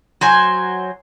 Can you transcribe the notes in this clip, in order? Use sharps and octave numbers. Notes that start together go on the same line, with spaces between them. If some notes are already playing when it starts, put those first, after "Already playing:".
F#3 C5 G#5